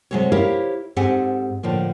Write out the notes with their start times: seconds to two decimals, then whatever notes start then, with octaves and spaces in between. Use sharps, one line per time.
0.11 C3 F#3 G#3 A4 C#5
0.32 E4 G4 A#4 C5 C#5 F5
0.96 G#2 C4 G4 A4 F#5 G#5
1.63 A2 D3 F3 A#3